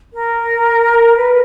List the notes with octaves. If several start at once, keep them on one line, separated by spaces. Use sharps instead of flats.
A#4
B4